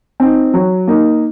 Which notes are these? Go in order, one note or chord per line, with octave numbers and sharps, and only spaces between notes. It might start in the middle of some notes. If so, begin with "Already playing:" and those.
C4 D#4
F#3
A#3 D#4